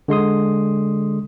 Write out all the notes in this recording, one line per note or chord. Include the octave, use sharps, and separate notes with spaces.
D3 G#3 C6 D#6